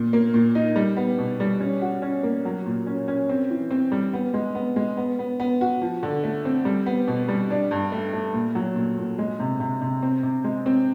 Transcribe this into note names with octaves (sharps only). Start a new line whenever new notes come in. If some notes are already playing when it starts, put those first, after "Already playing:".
Already playing: A#2
A#3
A#2
D#4
G3
B3
B2
G3
C#4
F#4
C#4
A#3
F#3
A#2
C#4
C#4
C4
E3
C4
G3
B3
G#3
B3
G#3
B3
B3
B3
F#4
F3
D3
A3
C4
G3
B3
B2
G3
D4
G2
A3
A3
A#2
F#3
A#2
A#2
G#3
C3
C3
C3
C4
C3
G#3
C4